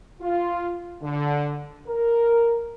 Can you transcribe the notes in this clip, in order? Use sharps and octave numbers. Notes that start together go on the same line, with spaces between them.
F4
D3
A#4